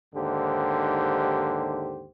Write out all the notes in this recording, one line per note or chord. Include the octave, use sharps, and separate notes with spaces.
D#2 G#2 D3 G4 C5